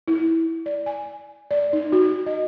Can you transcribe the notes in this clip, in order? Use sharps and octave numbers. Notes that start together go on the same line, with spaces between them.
E4
D5
G#5
D5
D#4
F#4
D#5